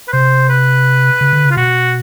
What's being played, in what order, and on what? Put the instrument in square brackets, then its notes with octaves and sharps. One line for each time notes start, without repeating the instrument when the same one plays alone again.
[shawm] B4
[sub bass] C3 [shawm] C5
[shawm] B4
[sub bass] C#3
D3
C#3
[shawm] F4
[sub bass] B2 [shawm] F#4